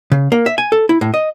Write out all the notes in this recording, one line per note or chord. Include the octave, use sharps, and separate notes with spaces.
C#3
A#3
E5
G#5
A4
E4
A2
D#5